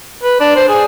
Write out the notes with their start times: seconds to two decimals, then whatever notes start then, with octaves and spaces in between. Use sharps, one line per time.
0.23 B4
0.40 D4
0.55 C5
0.68 G#4